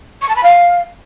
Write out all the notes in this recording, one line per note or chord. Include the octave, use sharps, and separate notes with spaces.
C#6
A5
B5
F5